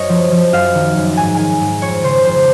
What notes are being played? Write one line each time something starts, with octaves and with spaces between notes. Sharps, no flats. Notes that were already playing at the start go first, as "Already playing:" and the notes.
Already playing: F#2 C#5 D#5
F3
F3
F#2 F5
D#3
F#2
G#2 G#5
D#3 G#5
G#2
F2 C#5
C#3 C5
F2 C5